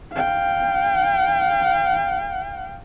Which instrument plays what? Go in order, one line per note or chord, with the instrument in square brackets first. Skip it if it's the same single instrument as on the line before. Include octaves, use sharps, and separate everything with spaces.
[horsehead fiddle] F5 G5